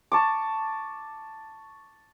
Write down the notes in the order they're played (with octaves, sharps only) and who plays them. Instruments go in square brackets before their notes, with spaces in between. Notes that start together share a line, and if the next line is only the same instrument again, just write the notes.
[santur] A5 C#6 D6